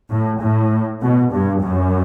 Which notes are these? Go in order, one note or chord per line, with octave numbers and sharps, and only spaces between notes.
A2
A2
B2
G2
F#2